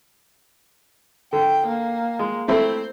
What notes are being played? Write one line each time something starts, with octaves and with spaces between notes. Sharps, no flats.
D3 G5
A#3
G#3
A3 C4 E4 C5